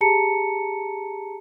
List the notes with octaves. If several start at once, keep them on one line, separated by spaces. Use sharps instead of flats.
G4 G#4 A5 A#5 C#7